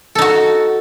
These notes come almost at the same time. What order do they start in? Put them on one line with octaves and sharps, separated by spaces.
A4 D#4 F#4